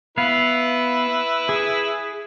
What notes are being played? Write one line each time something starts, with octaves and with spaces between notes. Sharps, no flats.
B3 E4 B4 F5
G#4